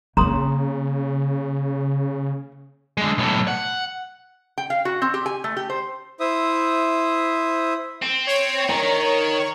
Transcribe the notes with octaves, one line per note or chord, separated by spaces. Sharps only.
C#3 A#3 C4 A#5 C6 D#6
D3 G#3
B1 A2
F#5
G5
F5
F#4
C4
G4
G#5
A3
G4
C5
E4 C5 E5 D#6
C4
C#5
D#3 A#5